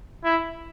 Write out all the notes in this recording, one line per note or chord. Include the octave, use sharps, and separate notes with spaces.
E4